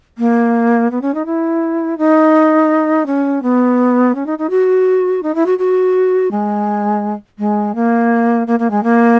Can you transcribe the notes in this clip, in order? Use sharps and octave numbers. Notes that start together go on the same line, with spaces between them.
A#3
B3
C#4
D#4
E4
D#4
C#4
B3
C#4
D#4
D#4
F#4
D#4
E4
F#4
F#4
G#3
G#3
A#3
A#3
A#3
G#3
A#3